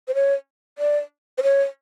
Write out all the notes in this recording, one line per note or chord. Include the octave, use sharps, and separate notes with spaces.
C5
C#5
D5
C5
C#5